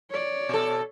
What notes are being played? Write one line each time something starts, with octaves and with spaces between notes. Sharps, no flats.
C#5 D5
B2 A4